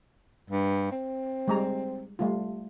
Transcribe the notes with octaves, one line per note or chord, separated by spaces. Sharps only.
G2
C4
G3 G#3 A#5
G3 A3 F4